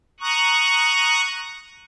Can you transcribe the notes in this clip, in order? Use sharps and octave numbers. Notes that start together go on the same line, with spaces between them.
A#5 C#6 D#6 F#6